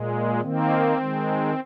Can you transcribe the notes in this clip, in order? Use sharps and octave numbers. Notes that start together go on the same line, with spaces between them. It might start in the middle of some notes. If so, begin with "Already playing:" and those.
Already playing: A#2 G#3
D#3 A#3 C4
D#3 G#3